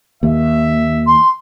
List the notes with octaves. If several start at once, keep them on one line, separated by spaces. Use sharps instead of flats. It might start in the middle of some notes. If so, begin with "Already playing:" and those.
D#2 E5
C6